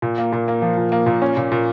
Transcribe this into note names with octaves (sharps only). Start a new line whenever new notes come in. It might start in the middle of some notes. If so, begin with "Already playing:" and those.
A#2
A#3
A#2
A#3
F3
A#2
A#3
A#2
C#4
A#2
A#2